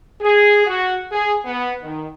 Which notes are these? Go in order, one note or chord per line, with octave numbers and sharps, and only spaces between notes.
G#4
F#4
G#4
B3
D#3